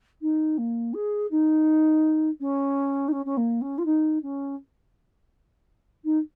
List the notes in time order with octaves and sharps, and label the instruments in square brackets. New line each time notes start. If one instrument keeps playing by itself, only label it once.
[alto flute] D#4
A#3
G#4
D#4
C#4
D#4
C#4
C#4
A#3
C#4
F4
D#4
C#4
D#4